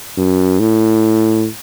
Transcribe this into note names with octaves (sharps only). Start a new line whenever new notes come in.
F#2
A2